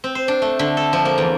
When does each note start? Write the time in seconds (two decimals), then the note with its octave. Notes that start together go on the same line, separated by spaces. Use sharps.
0.04 C4
0.15 C5
0.28 D4
0.42 A3
0.59 D3
0.77 A4
0.93 F3
1.05 A#3
1.18 E2